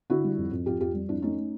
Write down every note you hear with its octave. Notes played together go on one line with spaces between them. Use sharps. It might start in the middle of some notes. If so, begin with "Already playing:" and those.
D3 E4 F#4
G3
F2
F2
F2 F4 G4
F2 F4 G4
G3
F2 D4 E4
A3 C#4 D#4
A3